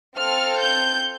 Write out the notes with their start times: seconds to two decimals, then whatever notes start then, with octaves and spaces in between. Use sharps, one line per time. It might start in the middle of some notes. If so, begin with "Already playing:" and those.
0.17 C4 F4 A4 F6
0.58 G6